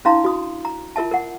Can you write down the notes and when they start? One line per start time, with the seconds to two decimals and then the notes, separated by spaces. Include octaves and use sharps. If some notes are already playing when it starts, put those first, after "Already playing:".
0.05 C#4 D4 E4 F5 A#5 C6
0.24 F#4 D#6
0.65 A#5
0.96 F4 A#4 E5 A5
1.11 A#4 F#5